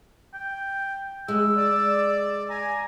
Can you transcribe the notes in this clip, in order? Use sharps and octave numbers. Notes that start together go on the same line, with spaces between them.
G5
G#3 E6
D5
G#5 A#5